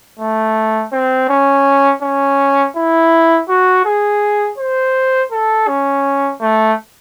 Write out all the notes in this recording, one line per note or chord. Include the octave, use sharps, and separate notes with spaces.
A3
C4
C#4
C#4
E4
F#4
G#4
C5
A4
C#4
A3